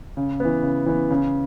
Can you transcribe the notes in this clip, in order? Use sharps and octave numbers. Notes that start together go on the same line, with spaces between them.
C#3
E3 B3
C#3
E3 B3
C#3